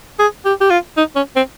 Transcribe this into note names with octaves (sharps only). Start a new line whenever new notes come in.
G#4
G4
G4
F4
D#4
C#4
C4